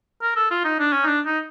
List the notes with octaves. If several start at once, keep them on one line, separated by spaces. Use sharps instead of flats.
A#4
A4
F4
D#4
D4
C#4
D#4
D4
D#4